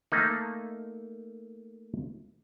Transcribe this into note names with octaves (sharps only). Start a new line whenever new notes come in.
A3 A#3 D#4